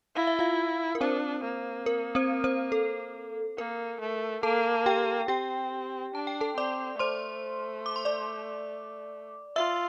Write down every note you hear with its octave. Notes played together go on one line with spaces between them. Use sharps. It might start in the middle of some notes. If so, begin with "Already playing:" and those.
E4 F5
E5
F4 F5
A#4
C4 D4 C5
A#3
A#4
C4 C5
C4 C5
A4
A#3 A#4
A3
A#3 A4 A5
G4 G5
C4 G4 G5
D4 A5
G5
A4 A5
C4 D5 D6
A3 C5 C6
D6
C6
D5 D6
F4 E5 E6